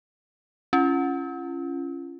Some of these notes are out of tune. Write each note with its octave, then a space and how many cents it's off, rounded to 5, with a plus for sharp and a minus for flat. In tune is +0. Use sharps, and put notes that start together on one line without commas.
C#4 +0 F4 -35